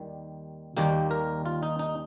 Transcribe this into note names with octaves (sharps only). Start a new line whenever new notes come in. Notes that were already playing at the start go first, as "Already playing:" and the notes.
Already playing: D#2 D#3 G3
D#2 D#3 G3 A#3 G4
A#4
F4
D#4
D#4